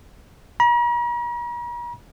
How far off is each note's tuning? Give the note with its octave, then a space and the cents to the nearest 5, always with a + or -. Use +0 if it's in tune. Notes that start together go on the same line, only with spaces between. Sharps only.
A#5 +45